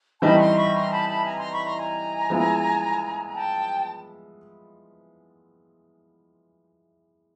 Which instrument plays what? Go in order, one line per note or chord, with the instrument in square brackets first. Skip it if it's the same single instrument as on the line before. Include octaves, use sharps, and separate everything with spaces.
[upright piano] E3 G3 C4 D#4 [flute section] A5 B5
[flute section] C#6
A#5 C6
B5 C#6
A#5 C6
A5 B5
A5 B5
G#5 A#5
A#5 C6
B5 C#6
A#5 C6
G#5 A#5
[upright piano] F3 G#3 B3 E4
[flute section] G5 A5